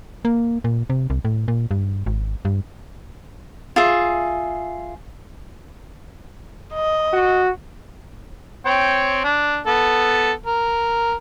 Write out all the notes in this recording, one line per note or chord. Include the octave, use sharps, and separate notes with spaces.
A#3
A#2
C3
C2
A2
A#2
G2
G#1
G2
F4 G#4 E5
D#5
F#4
C4 C#5 G5
D4
B3 A4
A#4